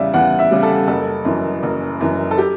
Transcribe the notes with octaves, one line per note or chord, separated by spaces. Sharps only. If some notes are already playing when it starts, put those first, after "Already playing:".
Already playing: E2 C#3 G3 D5 E5
E2 F#5
E5
C#3 G3
A4
F#1 A4
F#2 E3
F#1
F#2 E3
A4
G4